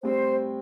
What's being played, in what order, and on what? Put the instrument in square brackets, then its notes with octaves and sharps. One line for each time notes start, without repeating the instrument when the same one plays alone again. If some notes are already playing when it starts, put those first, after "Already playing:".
[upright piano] A2 G3 C4 [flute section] C5